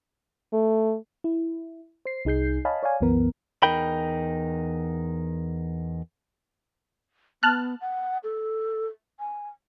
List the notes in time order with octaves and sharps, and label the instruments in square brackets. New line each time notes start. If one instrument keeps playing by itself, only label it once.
[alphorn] A3
[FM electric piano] E4
C5 C7
C2 D#4 G#4 G6 C7
C#5 D#5 F5 G#5 A5 B5
C#5 D5 F5 G#5
C2 F#2 E3 B3 A#4
[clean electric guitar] E2 G2 D#4 A#4 G5 B5
[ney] B3 [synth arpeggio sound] A5 F6 F#6
[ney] F#5
A4
G#5